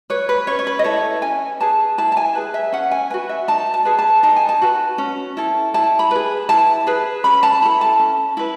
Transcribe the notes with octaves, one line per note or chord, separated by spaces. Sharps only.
B4 C#5
B4
C#4 C#5
C#5
B4
D#5
E4 A4 C#5
C#4 G#5
G#4 B4 A5
E4 A5
A5
G#5
G#4 B4
E5
C#4 F#5
G#5
F#4 B4 G#5
E5
D#4 A5
A5
G#4 B4
A5
D#4 A5
G#5
A5
F#4 B4
C#4
E4 A4
E4 A5
B5
G#4 B4
E4 A5
G#4 B4
C#4 B5
A5
E4 A4 B5
A5
C#4
E4 B4